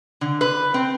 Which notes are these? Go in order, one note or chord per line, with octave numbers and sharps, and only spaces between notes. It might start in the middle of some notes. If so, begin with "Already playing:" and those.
D3
B4
C4